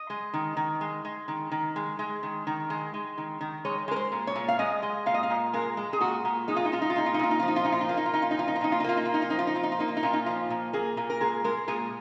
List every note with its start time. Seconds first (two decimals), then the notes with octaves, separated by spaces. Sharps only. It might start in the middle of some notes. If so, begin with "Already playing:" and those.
Already playing: D#5
0.10 G#3
0.33 D#3
0.57 D#3
0.81 G#3
1.05 G#3
1.28 D#3
1.51 D#3
1.76 G#3
1.99 G#3
2.23 D#3
2.47 D#3
2.70 G#3
2.94 G#3
3.18 D#3
3.41 D#3
3.65 G#3 C#5
3.88 G#3 A#4
3.96 C5
4.12 A#2
4.27 C#5
4.36 A#2
4.48 F5
4.59 G#3 D#5
4.83 G#3
5.06 A#2 F5
5.14 D#5
5.23 F5
5.30 A#2
5.53 G#3 A#4
5.77 G#3
5.93 G#4
6.01 A#2 F#4
6.25 A#2
6.48 G#3 D#4
6.56 F4
6.65 D#4
6.72 G#3 F4
6.82 D#4
6.90 F4
6.96 A#2 D#4
7.06 F4
7.14 D#4
7.19 A#2 F4
7.31 D#4
7.40 F3 F4
7.48 D#4
7.56 F4
7.65 A#2 D#4
7.72 F4
7.81 D#4
7.89 A#3 F4
7.97 D#4
8.06 F4
8.13 A#2 D#4
8.22 F4
8.31 D#4
8.37 F3 F4
8.48 D#4
8.56 F4
8.61 A#2 D#4
8.72 F4
8.80 D#4
8.84 A#3 F4
8.97 D#4
9.05 A#2 F4
9.14 D#4
9.22 F4
9.30 F3 D#4
9.39 F4
9.47 D#4
9.55 A#2 F4
9.63 D#4
9.72 F4
9.79 A#3 D#4
9.88 F4
9.97 D#4
10.03 A#2 F4
10.13 D#4
10.26 F3 F4
10.50 A#2
10.73 A#3 G#4
10.97 A#2
11.10 A#4
11.21 G#3 G#4
11.44 G#3 A#4
11.68 A#2 G#4